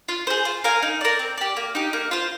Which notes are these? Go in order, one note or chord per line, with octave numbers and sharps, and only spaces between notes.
F4
G#4 C5
F4
A#4 F5 G#5
D#4
A#4 D5
C4
G4 D5
A#3
D#4 G4
A#3
F4 C5